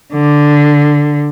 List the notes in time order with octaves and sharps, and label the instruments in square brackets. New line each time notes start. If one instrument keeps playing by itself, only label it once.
[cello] D3